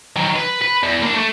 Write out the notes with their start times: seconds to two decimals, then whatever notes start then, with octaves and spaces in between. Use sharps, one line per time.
0.16 D#3 F#3
0.36 B4
0.62 B4
0.83 E2
1.02 A#3 D4
1.15 A3